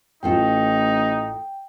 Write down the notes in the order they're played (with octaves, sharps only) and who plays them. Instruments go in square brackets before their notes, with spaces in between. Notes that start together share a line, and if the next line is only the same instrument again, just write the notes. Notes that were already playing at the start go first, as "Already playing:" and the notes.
[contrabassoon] A1 [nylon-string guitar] A2 F4 A4 [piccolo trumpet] D#4 [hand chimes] G5